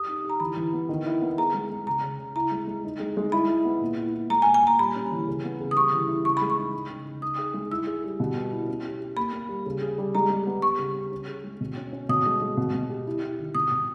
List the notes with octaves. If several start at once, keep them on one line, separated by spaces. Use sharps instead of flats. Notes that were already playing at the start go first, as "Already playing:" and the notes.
Already playing: G4 D#6
D#4
G4
A#5
E3 B5
E3
B3
D#3
E4
B3
G#4 A#5
G#3
G#3
C#3 A#5
C#3
C#3
E4 A#5
G#3
G#3
D#4
G#3
G#3
E4 B5
E4
B3
A#2
E4
E4
G#3 A#5
G#5
A#2
G#5
A#2 A#5
G3 B5
C#4
E3
C#3
B3
C#3
D#6
G3 C#6
E3
E4
C#3 C#6
G#3 B5
C#6
D#4
D#4
C#3
C#3
D#4 D#6
G#4
G#3
E4 E6
G#4
G3
B2
B3
E4
C#4
G4
G4
A#3 B5
A#3
G3
C#3
G#4
G3
G#3 A#5
G#3
B3
G3 C#6
C#3
C#4
C#4
G#4
G#3
B2
C#4
C#4
B2 D#6
G#3
G#3
B2
B2
G4
E4
E4
D#3
B2 D#6
B2